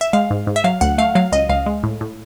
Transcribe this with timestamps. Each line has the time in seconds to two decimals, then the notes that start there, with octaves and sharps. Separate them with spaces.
0.01 E5
0.13 G#3 F5
0.30 G#2
0.47 G#2
0.56 E5
0.64 F#3 F5
0.81 D2 F#5
0.98 A3 F5
1.15 F#3 F5
1.32 C#2 D#5
1.49 C#2 F5
1.66 G#3
1.83 A2
2.01 A2